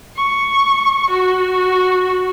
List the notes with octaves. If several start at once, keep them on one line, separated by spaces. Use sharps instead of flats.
C#6
F#4